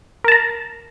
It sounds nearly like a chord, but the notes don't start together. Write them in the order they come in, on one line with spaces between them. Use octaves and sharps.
A#4 A5 A#5